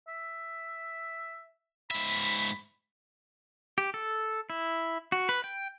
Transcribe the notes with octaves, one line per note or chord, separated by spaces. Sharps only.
E5
G#2 E5 B5
G4
A4
E4
F#4
B4
G5